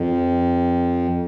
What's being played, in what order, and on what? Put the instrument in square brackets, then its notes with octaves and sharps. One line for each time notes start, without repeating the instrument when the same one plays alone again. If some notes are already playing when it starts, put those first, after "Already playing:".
Already playing: [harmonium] F2